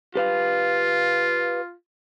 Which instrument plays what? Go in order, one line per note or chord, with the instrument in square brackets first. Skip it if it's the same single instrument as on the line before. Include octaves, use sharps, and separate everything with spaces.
[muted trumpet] F4 [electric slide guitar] G4 B4 F5